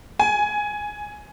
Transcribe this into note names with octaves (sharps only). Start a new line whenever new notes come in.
G#5